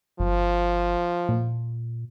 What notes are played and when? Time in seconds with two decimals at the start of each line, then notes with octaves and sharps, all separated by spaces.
0.20 G1 F3
1.29 A#2